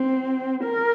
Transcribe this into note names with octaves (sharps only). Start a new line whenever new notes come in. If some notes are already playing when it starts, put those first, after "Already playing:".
Already playing: C4
A#4